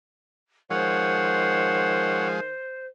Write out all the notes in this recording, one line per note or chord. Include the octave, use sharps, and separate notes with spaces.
D#3 F3 G#3 C5 C#5 F#5